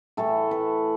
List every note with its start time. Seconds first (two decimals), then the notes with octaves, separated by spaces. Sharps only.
0.17 A2 E3 A3 A4
0.51 B4